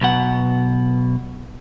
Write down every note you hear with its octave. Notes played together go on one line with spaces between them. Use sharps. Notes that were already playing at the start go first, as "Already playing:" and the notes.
B1 B2 F#5